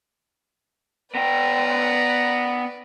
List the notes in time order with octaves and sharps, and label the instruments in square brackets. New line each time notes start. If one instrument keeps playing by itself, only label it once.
[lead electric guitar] B3 G5 [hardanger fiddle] B4 D5 [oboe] A#5